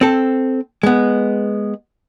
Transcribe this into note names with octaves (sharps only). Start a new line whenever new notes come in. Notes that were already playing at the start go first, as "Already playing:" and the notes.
C4 A4
G#3 B3